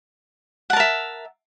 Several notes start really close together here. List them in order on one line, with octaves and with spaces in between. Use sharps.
F#5 A5 A#4 E5